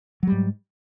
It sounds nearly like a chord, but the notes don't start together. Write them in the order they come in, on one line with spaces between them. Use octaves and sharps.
F#3 G3 G#2